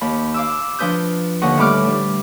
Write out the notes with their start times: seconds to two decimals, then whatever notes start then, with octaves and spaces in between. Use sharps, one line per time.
0.01 D#2 B5
0.34 F5 D6 E6
0.79 F3 D4 B4 D#6 G6
1.42 D#2 D3 D#5 F#5 C#6
1.57 A2 G3 B5 D6 F6
1.84 G3 D4